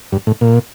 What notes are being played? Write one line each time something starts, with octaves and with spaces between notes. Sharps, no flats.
G2
A2
A#2